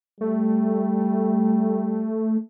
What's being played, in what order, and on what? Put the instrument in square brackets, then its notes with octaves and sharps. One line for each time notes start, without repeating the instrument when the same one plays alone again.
[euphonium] G3 [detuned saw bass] A3